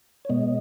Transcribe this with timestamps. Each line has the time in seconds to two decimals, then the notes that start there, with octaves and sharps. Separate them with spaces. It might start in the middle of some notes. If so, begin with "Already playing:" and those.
0.25 C#5
0.29 B2 G#3 B3 D#5